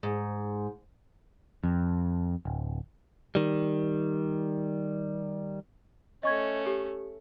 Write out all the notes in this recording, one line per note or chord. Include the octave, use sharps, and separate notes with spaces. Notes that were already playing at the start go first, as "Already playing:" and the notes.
G#2
F2
D1
D#3 G3
A3 C#4 D#5 C#6 G#6
G4 A4